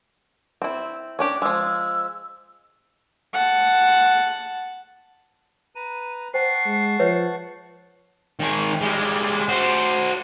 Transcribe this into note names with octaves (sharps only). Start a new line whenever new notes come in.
C4 E4
C#4 D4 G4
F3 G#3 E6
F#5 A5
B4 A#5 D#7
C5 F#5 G5 A5 C#6 C7
G#3
F3 B4 C#5 E5
D#3 G#4
G3 G#3
F#4 C5